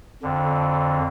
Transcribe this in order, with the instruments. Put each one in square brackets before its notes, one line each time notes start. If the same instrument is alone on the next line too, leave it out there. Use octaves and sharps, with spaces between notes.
[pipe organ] F2 D3